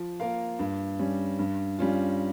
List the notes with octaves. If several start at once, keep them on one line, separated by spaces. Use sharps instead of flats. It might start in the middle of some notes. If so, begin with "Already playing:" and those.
Already playing: F3
A#3 F4 A#4 F5
G2
G3 C#4
G2
G3 C#4 F4